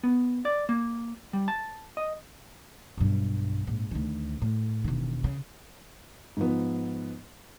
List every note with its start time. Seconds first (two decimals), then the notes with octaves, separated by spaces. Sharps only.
0.03 B3
0.45 D5
0.69 A#3
1.33 G3
1.48 A5
1.97 D#5
2.98 B1 G2
3.67 A#1 G#2
3.91 D2 D#3
4.42 A2
4.84 E1 D#3
5.24 C#3
6.37 G#2 F3 B3